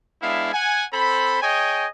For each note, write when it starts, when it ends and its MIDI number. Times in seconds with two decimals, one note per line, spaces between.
0.22 0.51 56
0.22 0.51 59
0.22 0.51 62
0.22 0.51 64
0.22 0.51 76
0.22 0.51 77
0.53 0.86 78
0.53 0.86 80
0.93 1.40 60
0.93 1.40 69
0.93 1.40 72
0.93 1.40 83
1.42 1.87 68
1.42 1.87 73
1.42 1.87 75
1.42 1.87 79
1.42 1.87 80